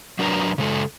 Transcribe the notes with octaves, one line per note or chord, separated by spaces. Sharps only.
F#3 D4 A#4 B4 A#5
C#3 G#3 A4